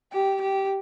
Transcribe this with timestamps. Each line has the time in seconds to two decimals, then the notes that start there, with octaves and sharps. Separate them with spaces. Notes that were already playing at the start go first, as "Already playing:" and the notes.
0.12 G4
0.41 G4